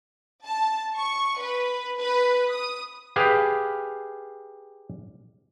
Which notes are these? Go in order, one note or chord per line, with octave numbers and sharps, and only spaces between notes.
A5
C#6
B4
B4
D#6
G4 G#4 B4 F5